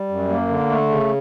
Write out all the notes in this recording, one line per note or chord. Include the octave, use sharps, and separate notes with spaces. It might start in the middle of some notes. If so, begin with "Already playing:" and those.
Already playing: G3
F#2
A#3
D3
A3
C#3